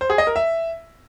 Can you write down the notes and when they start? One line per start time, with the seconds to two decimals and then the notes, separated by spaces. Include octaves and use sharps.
0.01 C5
0.10 G#4
0.18 D#5
0.27 A#4
0.36 E5